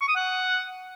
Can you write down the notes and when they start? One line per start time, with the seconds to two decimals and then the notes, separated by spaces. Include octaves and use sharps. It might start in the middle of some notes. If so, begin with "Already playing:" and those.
0.01 C#6
0.08 D#6
0.16 F#5